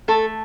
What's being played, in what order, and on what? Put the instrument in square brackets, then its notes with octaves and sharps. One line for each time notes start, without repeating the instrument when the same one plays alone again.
[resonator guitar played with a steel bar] A3 A4